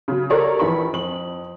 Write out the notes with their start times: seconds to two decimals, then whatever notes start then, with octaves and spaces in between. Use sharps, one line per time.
0.08 C#3 F#3
0.30 G4 A4 A#4 C#5 D5 A#5
0.59 A#1 E3 B5 C#6
0.92 F2 F#7